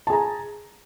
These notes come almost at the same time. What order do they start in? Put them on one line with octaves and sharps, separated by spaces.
A5 G#4 A#5